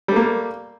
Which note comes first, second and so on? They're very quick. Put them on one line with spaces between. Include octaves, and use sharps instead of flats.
G3 A3 A#3